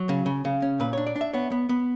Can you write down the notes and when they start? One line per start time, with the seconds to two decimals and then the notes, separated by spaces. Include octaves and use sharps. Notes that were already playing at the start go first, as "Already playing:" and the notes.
Already playing: F#3
0.09 C#3
0.26 C#3
0.45 C#3
0.62 C#4
0.80 A#2 B4
0.93 D4 C#5
1.07 D5
1.16 D4
1.21 E5
1.33 B3 C#5
1.52 B3
1.69 B3